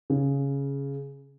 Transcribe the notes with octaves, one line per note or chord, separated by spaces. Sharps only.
C#3